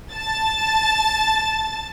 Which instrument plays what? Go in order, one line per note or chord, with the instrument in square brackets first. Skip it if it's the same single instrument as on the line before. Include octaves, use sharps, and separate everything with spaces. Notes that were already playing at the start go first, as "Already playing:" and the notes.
[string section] A5 A6